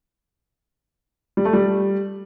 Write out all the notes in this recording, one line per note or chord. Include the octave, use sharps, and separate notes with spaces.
G3
A3
G3